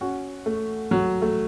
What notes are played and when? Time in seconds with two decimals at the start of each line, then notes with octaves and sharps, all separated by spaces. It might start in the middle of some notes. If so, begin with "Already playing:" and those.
0.01 C#4 F#4
0.46 A3
0.91 F#3
1.22 A3